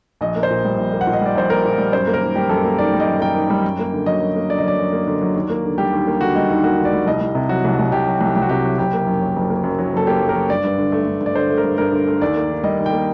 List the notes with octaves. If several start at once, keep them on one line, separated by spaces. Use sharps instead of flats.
A#1 D#5
A#3
C5
A#2
G3
A#1
A#3
F#5
A#2
D#5
G3 D5
A#1 C5
A#3 A#4
A#2
G3
F#2 C5
A#3
A#4
D#3
G3 G4
F#2 A4
A#3
D#3 D5
G3
D#5
F#2
A#3 G5
D#3
G3
F#2
A#3
D3
F#3 D#5
F#2
A#3
D3 D5
D#5
F#3 D5
F#2
A#3
D3
F#3
D#2
A#3
D3
G3 G4
D#2
A#3
D3 F#4
G3 D#4
D#2 D#4
A#3 F#4
D3
D5
G3
C2 D#5
C2
C3
F#3 F#4
C2
C2
C3 G4
F#3
C2
C2 G4
F#4
C3 G4
F#3
F#1 G4
A#3
F#2
F#3
F#1
A#3
F#2
F#3
F#1 A4
A#3 G4
F#2
A#4
F#3
G2 D5
G2
D3
A3
G2
G2
D5
D3 C5
A3
A#4
G2
G2 A#4
D3
A3
D#2 D5
A#3
D#3
G3 D#5
D#2
G5
A#3